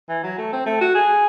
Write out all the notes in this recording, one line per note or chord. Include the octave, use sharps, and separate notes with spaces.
E3
F#3
A3
C4
A3
F#4
G#4